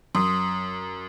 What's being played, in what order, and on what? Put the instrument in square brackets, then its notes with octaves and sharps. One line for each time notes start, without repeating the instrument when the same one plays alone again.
[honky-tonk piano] F#2 [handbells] C6 D#6